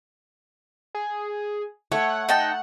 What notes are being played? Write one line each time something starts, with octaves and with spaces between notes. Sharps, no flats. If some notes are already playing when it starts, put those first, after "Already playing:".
G#4
A3 C#5 F#5
D#4 G5 A5